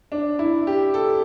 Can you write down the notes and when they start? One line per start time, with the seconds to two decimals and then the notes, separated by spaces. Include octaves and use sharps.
0.12 D4
0.39 E4
0.67 G4
0.94 A4